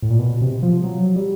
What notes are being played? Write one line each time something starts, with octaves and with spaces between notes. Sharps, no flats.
A2
A#2
B2
C3
F3
F#3
G3